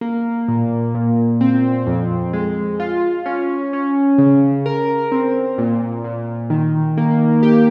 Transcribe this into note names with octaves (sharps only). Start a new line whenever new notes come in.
A#3
A#2
A#2
C4
F2
G#3
F4
C#4
C#4
C#3
A#4
C4
A#2
A#2
D#3
A#3
G4